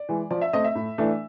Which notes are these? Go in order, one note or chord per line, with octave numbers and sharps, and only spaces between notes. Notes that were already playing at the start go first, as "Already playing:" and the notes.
Already playing: D5
E3 G#3
F3 D5
E5
A3 C4 D#5
E5
A2
E3 A3 D4